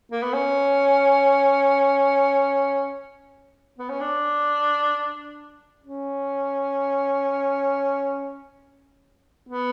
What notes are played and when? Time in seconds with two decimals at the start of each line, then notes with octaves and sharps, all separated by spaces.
0.12 A#3
0.23 B3
0.34 C#4
3.79 B3
3.89 C#4
4.01 D4
5.84 C#4
9.49 B3